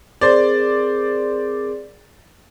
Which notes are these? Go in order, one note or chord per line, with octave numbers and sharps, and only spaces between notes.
C4 G#4 A#4 C5 D5